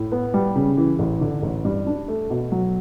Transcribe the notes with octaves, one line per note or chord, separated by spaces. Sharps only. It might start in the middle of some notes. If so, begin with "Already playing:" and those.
Already playing: A2
B3
G3
C#3
E3
A1
D3
A1
G2
D4
A3
B2
F#3